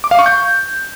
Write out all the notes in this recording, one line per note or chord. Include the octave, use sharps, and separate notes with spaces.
D6
F5
C#6
G6